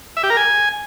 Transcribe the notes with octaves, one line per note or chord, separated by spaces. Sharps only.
E5
G4
A#4
G#5